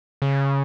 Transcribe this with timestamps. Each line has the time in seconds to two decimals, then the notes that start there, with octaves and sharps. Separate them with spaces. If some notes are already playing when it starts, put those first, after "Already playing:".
0.22 C#3